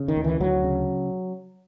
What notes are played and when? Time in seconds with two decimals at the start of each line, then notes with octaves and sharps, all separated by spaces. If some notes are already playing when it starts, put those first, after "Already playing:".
Already playing: C#3
0.08 D#3
0.16 D2
0.24 E3
0.40 D2 F#3
0.64 C#3